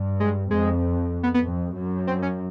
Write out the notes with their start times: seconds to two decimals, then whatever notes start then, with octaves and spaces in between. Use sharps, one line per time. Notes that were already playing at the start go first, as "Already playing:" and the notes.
Already playing: G2
0.20 G#3
0.51 F2 G#3
1.23 B3
1.34 B3
1.44 F2
1.76 F#2
2.07 C4
2.22 C#4